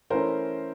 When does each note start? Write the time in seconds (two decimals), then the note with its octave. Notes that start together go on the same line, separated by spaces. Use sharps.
0.10 E3 A3 C#4 E4 A#4 C5